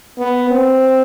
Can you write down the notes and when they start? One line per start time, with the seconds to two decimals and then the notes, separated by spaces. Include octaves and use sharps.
0.18 B3
0.51 C4